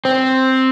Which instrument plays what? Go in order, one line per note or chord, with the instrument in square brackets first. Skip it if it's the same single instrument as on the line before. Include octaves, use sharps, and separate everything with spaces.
[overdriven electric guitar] C4